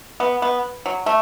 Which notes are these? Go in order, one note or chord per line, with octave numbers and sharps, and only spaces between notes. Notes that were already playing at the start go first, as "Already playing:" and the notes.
B3
B3
F#3
A3